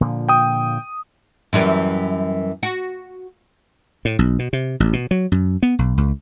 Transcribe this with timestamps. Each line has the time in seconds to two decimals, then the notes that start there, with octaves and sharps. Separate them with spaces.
0.01 A#2 D3 F3
0.29 G5 D#6
1.53 F#2 E3 G3
2.63 F#4
4.05 A2
4.19 B1
4.39 B2
4.53 C3
4.80 A1
4.93 B2
5.11 F#3
5.32 F#2
5.63 B3
5.79 B1
5.97 C#2